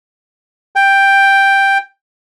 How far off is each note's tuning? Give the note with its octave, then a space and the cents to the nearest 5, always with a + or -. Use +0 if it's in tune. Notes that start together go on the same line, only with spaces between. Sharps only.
G5 +5